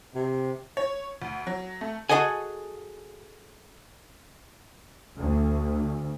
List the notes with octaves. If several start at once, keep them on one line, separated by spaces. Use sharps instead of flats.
C3
C#5
D2
F#3
A3
F#4 G#4 A4 D#5 F#5 G#5
D2